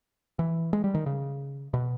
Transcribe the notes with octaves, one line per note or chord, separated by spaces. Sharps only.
E3
G#3
G3
D#3
C#3
B2